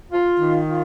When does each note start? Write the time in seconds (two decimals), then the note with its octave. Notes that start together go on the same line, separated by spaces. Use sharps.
0.12 F4
0.40 D#3
0.68 F4